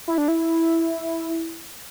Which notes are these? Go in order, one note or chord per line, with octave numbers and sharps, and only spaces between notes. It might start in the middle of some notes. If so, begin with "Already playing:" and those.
E4
D4
E4